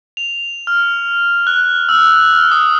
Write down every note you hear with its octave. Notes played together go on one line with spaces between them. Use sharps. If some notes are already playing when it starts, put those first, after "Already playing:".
F7
F6
F#6
E6
F6
D#6